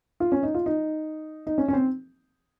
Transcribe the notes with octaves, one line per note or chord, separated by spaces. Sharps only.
F4
C#4
D#4
F4
D#4
D#4
C#4
C#4
C4